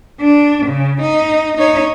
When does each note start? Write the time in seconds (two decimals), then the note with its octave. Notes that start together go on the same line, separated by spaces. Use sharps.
0.21 D4
0.66 C#3
1.01 D#4
1.57 D#4 C#5